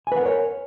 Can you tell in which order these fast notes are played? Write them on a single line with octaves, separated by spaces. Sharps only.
G#5 B4 F#5 A#4 C#5